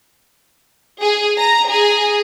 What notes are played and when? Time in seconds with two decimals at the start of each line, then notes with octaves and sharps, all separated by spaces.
1.00 G#4
1.39 A#5
1.70 G#4